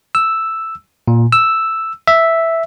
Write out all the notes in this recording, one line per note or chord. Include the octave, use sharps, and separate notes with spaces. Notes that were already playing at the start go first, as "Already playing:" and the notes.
E6
A#2
E6
E5